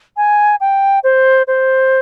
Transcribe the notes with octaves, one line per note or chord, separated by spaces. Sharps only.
G#5
G5
C5
C5